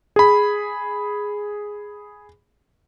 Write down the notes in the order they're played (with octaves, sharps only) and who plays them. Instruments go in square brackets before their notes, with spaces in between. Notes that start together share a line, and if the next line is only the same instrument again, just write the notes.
[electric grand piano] G#4 B5